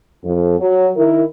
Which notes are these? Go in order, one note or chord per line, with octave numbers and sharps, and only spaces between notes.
F2
F#3
D#3 E4 A#4